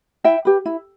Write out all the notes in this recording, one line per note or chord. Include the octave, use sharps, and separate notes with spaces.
E4 E5 G5
G4 B4
E4